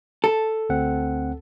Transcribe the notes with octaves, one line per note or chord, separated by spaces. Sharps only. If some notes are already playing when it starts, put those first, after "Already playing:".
A4
D2 C4 F#5